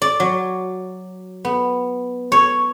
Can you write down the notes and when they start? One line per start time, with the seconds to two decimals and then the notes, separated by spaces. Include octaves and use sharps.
0.02 D5
0.20 F#3
1.45 B3
2.32 C#5